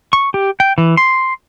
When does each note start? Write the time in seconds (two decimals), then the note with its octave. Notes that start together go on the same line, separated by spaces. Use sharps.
0.13 C#6
0.34 G4
0.60 G5
0.78 E3
0.97 C6